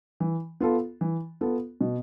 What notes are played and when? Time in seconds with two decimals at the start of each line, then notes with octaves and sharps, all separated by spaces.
0.20 E3
0.60 B3 F4 A4
1.01 E3
1.41 B3 F4 A4
1.81 B2